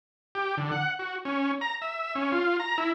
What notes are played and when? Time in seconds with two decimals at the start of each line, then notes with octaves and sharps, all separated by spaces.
0.35 G4
0.57 D3
0.72 F#5
0.99 F#4
1.25 C#4
1.61 A#5
1.82 E5
2.15 C#4
2.32 F4
2.60 A#5
2.78 E4